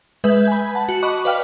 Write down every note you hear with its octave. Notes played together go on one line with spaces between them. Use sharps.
G#3 B4 E5 G6
G#5 B5
F#5 A5
F#4
D#5 B5 C#6 D6 F#6
B4 D5 F5 G5 F6